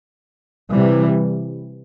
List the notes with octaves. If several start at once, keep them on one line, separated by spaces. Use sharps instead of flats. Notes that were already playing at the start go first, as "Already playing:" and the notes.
C3 E3 G3